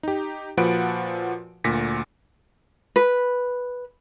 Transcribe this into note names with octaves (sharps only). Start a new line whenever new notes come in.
D#4 G4
A#2 F3 F#4 B4 F#5 D7
D2 A#2 A#6 B6 C#7
B4